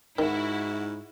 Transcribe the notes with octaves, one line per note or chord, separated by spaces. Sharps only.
G#2 D#3 E4 F#4